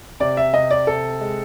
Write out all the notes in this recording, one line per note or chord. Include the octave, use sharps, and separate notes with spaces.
C3 D5
E5
C3 D#5
D5
C3 A4
G#3